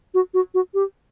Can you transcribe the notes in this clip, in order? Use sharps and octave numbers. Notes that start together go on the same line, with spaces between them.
F#4
F#4
F#4
G4